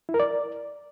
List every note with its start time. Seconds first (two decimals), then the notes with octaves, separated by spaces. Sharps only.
0.09 E4
0.14 A#4
0.20 D5